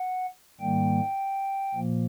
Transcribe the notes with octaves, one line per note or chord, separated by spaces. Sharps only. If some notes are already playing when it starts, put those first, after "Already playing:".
Already playing: F#5
G#2 D#3 G3 A#3 G5
A#2 F3 A#3